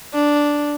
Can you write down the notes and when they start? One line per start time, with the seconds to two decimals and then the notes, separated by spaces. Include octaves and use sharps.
0.13 D4